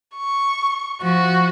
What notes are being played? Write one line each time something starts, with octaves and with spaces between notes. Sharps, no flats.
C#6
F3 F#4